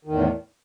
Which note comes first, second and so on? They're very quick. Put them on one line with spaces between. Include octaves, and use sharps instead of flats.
D#3 E2 A2